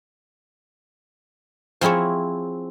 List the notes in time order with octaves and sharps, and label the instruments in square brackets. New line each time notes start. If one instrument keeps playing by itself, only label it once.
[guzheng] F3 C4 E4 G#4 C#5